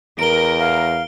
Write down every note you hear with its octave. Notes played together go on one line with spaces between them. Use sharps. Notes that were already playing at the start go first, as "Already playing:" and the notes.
E2 A#4 D7 G7
F5